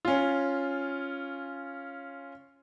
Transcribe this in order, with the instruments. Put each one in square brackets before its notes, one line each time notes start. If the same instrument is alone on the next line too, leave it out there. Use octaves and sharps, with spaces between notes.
[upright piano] C#4 F4